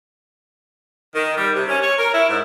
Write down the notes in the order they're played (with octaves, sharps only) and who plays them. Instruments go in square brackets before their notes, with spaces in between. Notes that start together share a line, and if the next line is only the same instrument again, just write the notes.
[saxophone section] D#3
G3
C3
C#4
C#5
A#4
E4
G#2